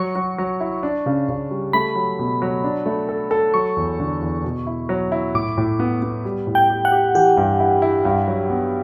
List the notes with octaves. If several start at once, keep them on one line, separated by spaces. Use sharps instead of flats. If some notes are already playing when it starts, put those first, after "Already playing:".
Already playing: F#3 C#6
F#3
F#3
E4
D4
C#3
C#3
G3
A3 B5
F#3
B2
F#3
D4
A3
A4
A4
F#3 C#6
E2
D3
E2
B2
E4
F#3
E4
A2 D6
A2
B3
B3
G3
A2
G5
G4
F#5
G4
E3 G4
G2
E4
E4
G2
F#3
B3